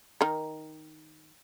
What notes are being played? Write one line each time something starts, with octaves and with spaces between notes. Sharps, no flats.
D#3 D#4 A#4